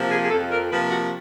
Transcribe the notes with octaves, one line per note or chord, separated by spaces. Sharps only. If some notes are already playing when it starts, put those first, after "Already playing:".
Already playing: C3 F3 A#3
G#4
G#4
F2 A4
A#4
C3 F3 A#3 B4
F#4